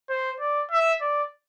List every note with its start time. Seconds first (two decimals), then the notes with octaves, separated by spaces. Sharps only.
0.10 C5
0.40 D5
0.71 E5
1.01 D5